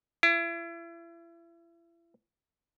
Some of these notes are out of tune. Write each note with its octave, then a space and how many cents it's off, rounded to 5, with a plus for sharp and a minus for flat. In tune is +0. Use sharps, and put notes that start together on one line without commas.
E4 +35